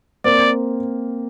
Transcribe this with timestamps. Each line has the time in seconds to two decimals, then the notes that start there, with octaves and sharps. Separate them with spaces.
0.24 A#3 C4 D5